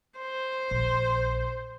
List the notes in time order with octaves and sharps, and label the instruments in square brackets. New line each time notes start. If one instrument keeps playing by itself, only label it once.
[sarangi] C5
[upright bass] A#1